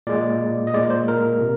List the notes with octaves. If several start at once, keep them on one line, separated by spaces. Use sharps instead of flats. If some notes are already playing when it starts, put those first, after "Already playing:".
A#2 G#3 D5
D#5
A#2 G#3 D5
C5
A#4
C3